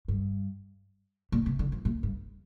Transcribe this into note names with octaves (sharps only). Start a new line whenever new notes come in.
G2
A#2
C3
D3
F3
A#2
G2